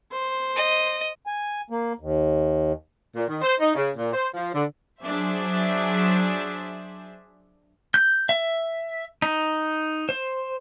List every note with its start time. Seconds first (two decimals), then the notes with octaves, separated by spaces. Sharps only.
0.12 C5
0.56 D#5
1.27 G#5
1.70 A#3
1.99 D#2
3.16 A#2
3.28 D#3
3.42 C5
3.60 D#4
3.74 C#3
3.96 A#2
4.13 C5
4.34 F3
4.53 D3
5.03 F#3 D4 G#4 C5 E5
7.94 G6
8.29 E5
9.22 D#4
10.09 C5